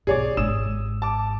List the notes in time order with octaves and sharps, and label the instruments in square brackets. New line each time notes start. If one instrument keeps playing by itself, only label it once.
[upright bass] B1 G#2 [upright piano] G#4 C#5 D5
[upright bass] G#1 G#2 [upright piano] D#6 E6 E7
[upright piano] A5 D6